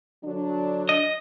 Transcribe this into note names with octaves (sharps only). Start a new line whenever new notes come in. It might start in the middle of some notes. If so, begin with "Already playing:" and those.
D3 F#3 D4
D#5